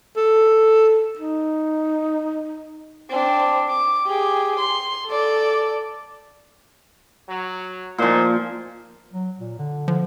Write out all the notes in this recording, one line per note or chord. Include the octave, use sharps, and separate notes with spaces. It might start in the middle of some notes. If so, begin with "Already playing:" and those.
A4
D#4
C4 D4
D6
G4 G#4
C6
A4 D5
F#3
A#2 F3 D#4 C5 G#5
F#3
A#2
D3
D3 F3